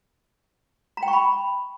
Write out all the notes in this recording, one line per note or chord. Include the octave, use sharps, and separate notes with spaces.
A#5
G5
C#6
B5